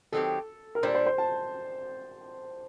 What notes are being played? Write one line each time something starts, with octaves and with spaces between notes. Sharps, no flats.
D#3 F#3 C4 G4 A4
A#4
A#2 G3 D4 A4 C5
C5
C5
A5